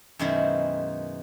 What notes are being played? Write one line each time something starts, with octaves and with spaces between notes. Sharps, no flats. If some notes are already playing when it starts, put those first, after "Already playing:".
F#2 B2 D#3 G#3 E4 C5